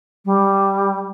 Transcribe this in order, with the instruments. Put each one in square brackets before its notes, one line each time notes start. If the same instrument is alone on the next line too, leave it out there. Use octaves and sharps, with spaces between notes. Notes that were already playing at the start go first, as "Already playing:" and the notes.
[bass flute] G3